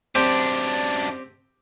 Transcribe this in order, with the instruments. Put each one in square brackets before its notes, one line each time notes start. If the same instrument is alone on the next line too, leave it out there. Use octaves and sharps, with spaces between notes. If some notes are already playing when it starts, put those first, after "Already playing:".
[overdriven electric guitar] F#2 D4 [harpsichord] C4 G4